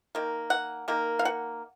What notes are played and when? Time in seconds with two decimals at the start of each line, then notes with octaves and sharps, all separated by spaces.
0.15 D#3 A#3
0.50 F#5
0.88 D#3 A#3
1.19 F5
1.25 F#5